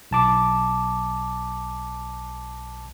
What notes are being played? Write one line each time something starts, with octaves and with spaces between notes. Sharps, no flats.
B1 A5 D6